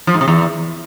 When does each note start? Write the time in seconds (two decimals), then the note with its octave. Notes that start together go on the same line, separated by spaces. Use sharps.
0.07 F3
0.14 G#2
0.21 C3
0.28 E2